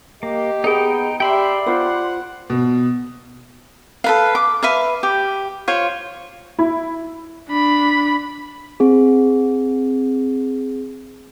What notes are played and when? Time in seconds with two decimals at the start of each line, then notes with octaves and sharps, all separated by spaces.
0.23 A#3 G4 D#5
0.64 B3 D#4 G#4 D#5 G5
1.20 G4 D5 E5 G5 B5 C6
1.66 F4 C5 F#5
2.50 B2
4.04 A4 B4 F5
4.35 D6
4.63 B4 E5 F5
5.03 G4
5.68 F4 C5 C#5
6.59 E4
7.49 D4 B5
8.80 C4 G#4